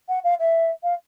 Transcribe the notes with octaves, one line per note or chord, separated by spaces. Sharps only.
F#5
F5
E5
F5